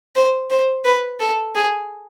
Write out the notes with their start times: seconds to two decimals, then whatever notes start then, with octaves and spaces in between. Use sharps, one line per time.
0.16 C5
0.50 C5
0.85 B4
1.20 A4
1.55 G#4